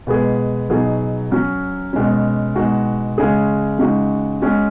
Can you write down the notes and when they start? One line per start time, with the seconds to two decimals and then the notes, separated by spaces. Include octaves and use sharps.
0.07 B2 G#3 B3 G#4
0.70 B2 F#3 D#4 G#4
1.31 F#3 C#4 F#4
1.93 B2 G#3 C#4
2.55 B2 G#3 D#4 F#4
3.18 C#3 G#3 C#4 G#4
3.79 C#3 G#3 D#4 F#4
4.42 G#3 C#4 F#4